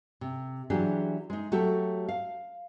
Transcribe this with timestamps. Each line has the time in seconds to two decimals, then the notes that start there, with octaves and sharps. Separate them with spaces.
0.21 C3
0.70 E3 F#3 D4 G4 G#4
1.30 G#3 D#4
1.52 F#3 A3 F#4 G4
2.09 F5